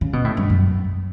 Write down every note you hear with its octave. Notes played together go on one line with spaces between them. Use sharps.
C#3
B2
A2
G2
F#2